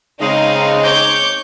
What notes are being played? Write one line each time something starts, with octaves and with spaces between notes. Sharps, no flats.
C#3 G#3 C4 D#4 F5
C#5 D6 G6